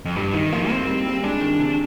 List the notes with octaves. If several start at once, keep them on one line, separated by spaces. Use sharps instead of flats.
F2
G2 G3
D#3 D#4
F3 A#3
A#3 C4
G3
G3
G#3 D4
D#3
C3